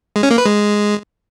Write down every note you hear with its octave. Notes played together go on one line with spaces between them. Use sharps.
G#3
C#4
A#3
B4
G#3